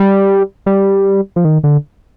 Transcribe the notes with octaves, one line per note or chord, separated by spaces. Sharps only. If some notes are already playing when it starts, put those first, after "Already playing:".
Already playing: G3
G3
F3
D#3
D3